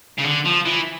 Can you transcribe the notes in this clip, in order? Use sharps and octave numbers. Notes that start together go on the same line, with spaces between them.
C#3
D3
F3
E3